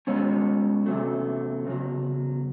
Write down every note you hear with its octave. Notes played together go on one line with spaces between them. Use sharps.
B2 G#3 C#4 C#5
E2 C3 D#3 F#3 A3
E2 C#3 F#3